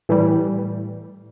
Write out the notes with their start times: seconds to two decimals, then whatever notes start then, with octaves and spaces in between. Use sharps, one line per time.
0.09 A2 E3 G3